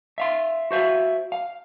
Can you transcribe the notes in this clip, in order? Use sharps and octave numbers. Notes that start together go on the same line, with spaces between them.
E5 F5 C6
F#4 C5 E5 F5
F5